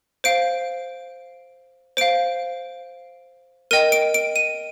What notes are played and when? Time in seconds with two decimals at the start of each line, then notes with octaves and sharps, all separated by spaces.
0.24 C5 F5 D7
1.97 C5 F5 D7
3.71 A#4 D#5 G5 D#7
3.92 D7
4.14 D7
4.36 D#7